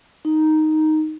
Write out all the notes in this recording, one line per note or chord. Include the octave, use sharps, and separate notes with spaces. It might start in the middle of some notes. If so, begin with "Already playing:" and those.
D#4